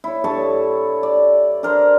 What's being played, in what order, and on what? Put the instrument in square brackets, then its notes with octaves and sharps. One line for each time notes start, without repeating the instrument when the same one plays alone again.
[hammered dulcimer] E4 C#5
G2 A4 C#5 A5
D5
D4 A#4 C5